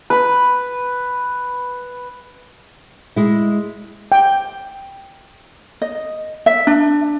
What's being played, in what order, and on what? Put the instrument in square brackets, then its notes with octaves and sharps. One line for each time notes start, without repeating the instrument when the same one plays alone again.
[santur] B4 B5
[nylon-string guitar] G#3 E4
[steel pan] G5
[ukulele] D#5
E5
D4